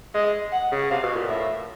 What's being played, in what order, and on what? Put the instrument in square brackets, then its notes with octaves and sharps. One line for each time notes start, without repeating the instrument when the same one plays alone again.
[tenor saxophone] G#3 [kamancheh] D#5
[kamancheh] F#5
[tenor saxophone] C#3
[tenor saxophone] C3 [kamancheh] F5
[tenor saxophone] B2
A#2
[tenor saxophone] A2 [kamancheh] E5